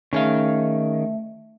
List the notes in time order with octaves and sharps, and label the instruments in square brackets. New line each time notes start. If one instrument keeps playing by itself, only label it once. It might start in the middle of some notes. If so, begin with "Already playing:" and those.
[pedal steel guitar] D#3 [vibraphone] A3 E5 [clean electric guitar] C#4 G#4 F5